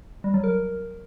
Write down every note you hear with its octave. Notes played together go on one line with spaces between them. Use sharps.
G3
F#3
A#4